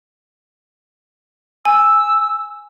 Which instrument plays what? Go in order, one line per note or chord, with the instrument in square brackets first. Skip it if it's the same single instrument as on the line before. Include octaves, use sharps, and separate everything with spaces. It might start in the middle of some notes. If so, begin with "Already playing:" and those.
[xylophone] G#5 [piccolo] E6